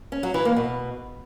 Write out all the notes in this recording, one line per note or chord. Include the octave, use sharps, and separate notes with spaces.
C#4
F#3
E3
A#3
B2